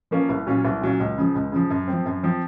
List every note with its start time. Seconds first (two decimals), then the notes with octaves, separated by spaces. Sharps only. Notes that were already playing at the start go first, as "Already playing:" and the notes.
0.11 F3 A#3 C#4 F4
0.29 C2
0.47 A#2 F#3 C#4 F4
0.65 C2
0.81 A#2 F#3 C#4 F4
1.00 C#2
1.18 C#3 F3
1.35 C#2
1.52 C#3 F3
1.70 F#2
1.88 F3 C4
2.06 F#2
2.23 F3 C4